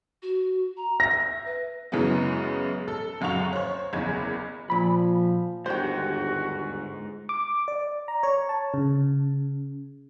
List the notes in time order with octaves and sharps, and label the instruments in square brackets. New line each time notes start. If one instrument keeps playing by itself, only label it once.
[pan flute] F#4
A#5
[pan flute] E5 [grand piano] A#6
[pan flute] B4
[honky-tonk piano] F#2 C#3 E3 G#3 B3
A4
F#1 F#2 F5 F#5 C#6 F7
C5 C#5
F#1 E2 B5 G#6
[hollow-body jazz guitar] A#2 B5 [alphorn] F3
[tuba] G1 [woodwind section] D#2 F#4 [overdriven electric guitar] G#2 [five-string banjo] C5 G5
[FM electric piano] D6
D5
A#5
C#5
A5
C#3